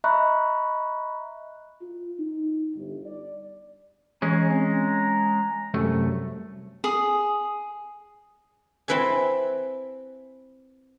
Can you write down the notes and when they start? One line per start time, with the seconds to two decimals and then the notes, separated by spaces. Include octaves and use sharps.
0.04 D#5 E5 A#5 B5 C#6 F#6
1.82 F4
2.19 D#4
2.76 G1
3.06 D5
4.22 E3 G#3 C#4 A#5
4.51 C4
5.74 C2 F#2 A3
6.84 G#4 D#6
8.88 C4 E4 B4 E5 G#5